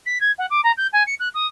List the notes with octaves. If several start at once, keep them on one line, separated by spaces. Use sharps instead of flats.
B6
G#6
F#5
D6
A#5
G6
G#5
C#7
F#6
D#6